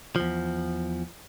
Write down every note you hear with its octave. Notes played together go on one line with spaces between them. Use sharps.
E2 F3